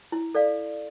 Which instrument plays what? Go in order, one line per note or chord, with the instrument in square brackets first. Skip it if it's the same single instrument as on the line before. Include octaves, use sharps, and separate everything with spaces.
[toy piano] E4
A4 D5 F5